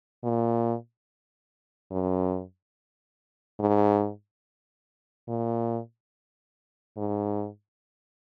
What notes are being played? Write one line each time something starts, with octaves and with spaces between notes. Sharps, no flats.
A#2
F#2
G#2
A#2
G#2